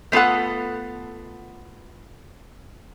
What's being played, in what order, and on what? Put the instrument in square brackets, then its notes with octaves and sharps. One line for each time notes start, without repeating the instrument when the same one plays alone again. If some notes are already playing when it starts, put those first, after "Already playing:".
[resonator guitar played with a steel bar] A3 B3 F4 A4 F#5